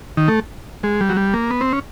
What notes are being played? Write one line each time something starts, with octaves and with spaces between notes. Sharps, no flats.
D#3
A3
G#3
G3
F#3
G3
A#3
B3
C4
C#4